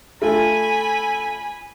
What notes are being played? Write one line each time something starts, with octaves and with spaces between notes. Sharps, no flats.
A3 F4 G#5 B5